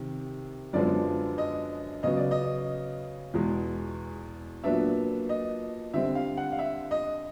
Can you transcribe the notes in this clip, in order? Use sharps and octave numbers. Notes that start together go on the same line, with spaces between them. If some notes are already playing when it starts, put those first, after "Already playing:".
Already playing: C3 D#3
F#2 D3 F3 G#3 B3 D5
D#5
C#3 F#3 B3 D#5
D5
D#5
E2 B2 G#3
A#2 F#3 B3 D4 E5
D#5
D3 G3 C4 E5
F5
F#5
F5
E5
D#5